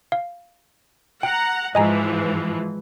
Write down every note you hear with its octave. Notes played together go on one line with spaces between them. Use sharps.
F5
F#5 G5 A#5
G#2 E3 F3 D#5 G#5 A#5